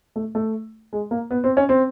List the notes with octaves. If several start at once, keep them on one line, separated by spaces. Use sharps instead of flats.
A3
A3
G#3
A#3
B3
C4
C#4
C4